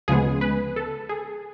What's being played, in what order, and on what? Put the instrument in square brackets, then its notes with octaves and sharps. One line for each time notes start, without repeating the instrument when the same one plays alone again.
[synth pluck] D2 C#3 F3 G#3 B3 G#4
B4
A4
G#4